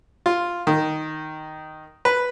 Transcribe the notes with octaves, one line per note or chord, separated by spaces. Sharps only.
F4
D#3
B4